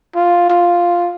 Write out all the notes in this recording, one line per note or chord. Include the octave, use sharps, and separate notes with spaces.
F4
F4